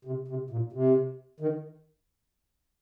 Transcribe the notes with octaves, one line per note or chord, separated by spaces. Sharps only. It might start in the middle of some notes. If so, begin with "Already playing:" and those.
C3
C3
A#2
C3
D#3